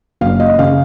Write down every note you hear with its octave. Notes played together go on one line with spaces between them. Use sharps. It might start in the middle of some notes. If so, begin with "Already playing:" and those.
F#1 F5
D#5
C#3 F5